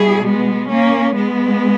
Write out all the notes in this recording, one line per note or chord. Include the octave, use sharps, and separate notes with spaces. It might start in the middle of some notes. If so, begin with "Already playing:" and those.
Already playing: B2 G3 E4 G#4
G#3 B3
A#3 C#4
G#3 B3